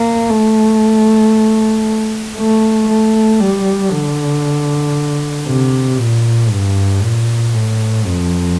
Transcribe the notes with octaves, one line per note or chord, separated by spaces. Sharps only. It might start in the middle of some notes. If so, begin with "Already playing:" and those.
Already playing: A#3
A3
A3
A3
G3
D3
C3
A#2
G2
A#2
A2
F2